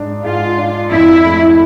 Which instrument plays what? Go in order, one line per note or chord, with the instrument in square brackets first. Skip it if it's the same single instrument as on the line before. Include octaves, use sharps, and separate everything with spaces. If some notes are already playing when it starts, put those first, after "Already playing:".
Already playing: [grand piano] G#2 D4
[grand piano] G#2 [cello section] F4
[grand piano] D4
[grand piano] F2 [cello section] E4
[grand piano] A3